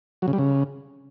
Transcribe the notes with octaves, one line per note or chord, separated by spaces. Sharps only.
F#3
C#3
G3
C#3